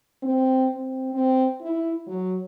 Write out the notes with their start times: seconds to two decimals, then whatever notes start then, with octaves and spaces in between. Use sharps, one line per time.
0.23 C4
0.75 C4
1.14 C4
1.61 E4
2.07 F#3